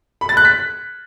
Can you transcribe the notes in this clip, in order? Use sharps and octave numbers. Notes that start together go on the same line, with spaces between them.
B5
A6
F#6
B6